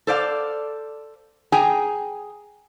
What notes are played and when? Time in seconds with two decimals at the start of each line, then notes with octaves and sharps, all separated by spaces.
0.07 A4 C5 D5 F5
1.52 G#4 G5 G#5 A#5